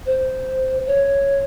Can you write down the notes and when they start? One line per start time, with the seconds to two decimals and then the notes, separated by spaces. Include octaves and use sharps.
0.06 C5
0.87 C#5